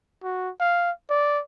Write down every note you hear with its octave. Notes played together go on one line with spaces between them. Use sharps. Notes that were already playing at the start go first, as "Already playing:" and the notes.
F#4
F5
D5